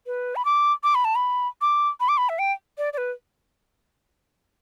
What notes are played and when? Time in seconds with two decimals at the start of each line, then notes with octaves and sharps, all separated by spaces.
0.07 B4
0.36 B5
0.45 D6
0.84 D6
0.95 B5
1.05 A5
1.15 B5
1.61 D6
2.00 B5
2.08 D6
2.17 B5
2.29 E5
2.39 G5
2.78 D5
2.93 D5
2.98 B4